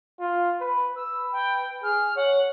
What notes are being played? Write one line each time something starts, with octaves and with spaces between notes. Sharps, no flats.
F4
B4
B4 E6
G5
G#4 F6
C#5 F#5